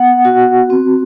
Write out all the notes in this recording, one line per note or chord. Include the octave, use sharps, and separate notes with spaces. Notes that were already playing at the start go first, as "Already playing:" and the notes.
Already playing: B3 F#5
F#4
C4